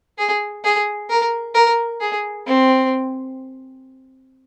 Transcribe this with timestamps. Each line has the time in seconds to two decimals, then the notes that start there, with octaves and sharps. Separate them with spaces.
0.18 G#4
0.64 G#4
1.10 A#4
1.55 A#4
2.00 G#4
2.47 C4